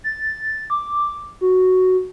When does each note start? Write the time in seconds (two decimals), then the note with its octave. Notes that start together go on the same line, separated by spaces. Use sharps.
0.04 A6
0.70 D6
1.41 F#4